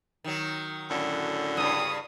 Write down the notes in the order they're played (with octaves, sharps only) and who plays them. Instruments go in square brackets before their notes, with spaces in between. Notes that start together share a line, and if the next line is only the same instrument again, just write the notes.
[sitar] D#3 F#3
[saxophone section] F#2 A2 D3
[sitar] G2 C#3 [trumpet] D#6